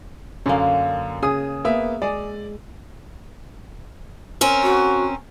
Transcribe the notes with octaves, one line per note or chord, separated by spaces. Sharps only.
F#2 D3 A#3 C#4
C#3 G#4 D#6
A#3 B3 E5
G#3 D5
C4 C#4 A#4
F#4